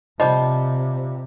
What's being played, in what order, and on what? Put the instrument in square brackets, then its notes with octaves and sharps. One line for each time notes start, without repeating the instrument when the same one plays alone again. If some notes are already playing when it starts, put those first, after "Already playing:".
[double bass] C3 [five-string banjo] F3 G3 [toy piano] D#5